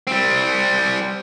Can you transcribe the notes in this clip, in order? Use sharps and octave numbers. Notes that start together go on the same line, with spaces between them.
G3 C4